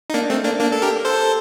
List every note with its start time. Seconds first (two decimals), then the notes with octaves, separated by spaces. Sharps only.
0.10 D#4
0.14 A#3 D4
0.30 A3 C4
0.44 A#3 D4
0.60 A#3 D4
0.72 A4
0.82 G4 A#4
1.05 A4 C5